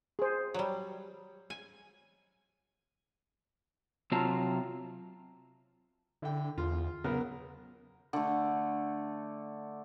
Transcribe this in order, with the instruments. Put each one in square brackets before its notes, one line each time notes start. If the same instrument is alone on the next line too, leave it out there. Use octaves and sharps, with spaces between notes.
[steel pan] G#4 C5
[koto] F#3 G3
G#5
[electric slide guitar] C3 F#3 C4 F4 A5 A#5
[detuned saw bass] D3 [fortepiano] E4 G5
[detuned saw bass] E2 [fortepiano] F4
[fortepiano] B1 B3 A#4 [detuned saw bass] C#3
[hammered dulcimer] D3 A3